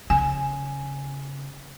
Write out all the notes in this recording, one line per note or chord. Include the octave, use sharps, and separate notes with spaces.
C#3 G#5